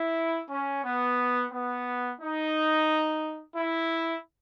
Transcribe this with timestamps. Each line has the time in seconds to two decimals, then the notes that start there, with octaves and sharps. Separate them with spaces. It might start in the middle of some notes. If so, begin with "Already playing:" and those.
Already playing: E4
0.50 C#4
0.83 B3
1.51 B3
2.20 D#4
3.56 E4